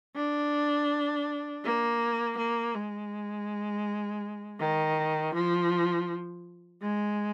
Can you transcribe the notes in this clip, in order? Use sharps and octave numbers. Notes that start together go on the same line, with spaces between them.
D4
A#3
A#3
G#3
D#3
F3
G#3